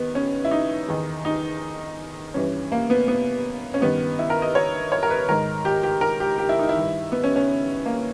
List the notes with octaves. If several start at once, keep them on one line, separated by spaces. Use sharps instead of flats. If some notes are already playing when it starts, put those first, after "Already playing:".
Already playing: G2 D#3 B3
C#4
E4
D#4
E2 D#3
D#4
G2 E3 C#4
A#3
B3
B3
C#4
G2 D#3 B3
E4
A#4
D#5
C#5
C#5
A#4
B4
G#2 D#3 A#4
G4
G4
A#4
G4
G4
E4
D#4
E4
G2 D#3
B3
C#4
C#4
A#3